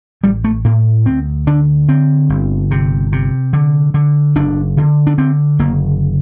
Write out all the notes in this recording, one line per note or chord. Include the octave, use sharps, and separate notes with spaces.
A1 G3
A3
A2 A#3
D2 C4
D3 D4
D3 C4
G1
C3
C3
D3
D3
F#1 D4
D3
D4
D3 C4
F#1 A#3